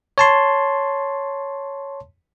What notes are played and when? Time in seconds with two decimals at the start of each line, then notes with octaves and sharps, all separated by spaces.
0.18 C#5 A5 C6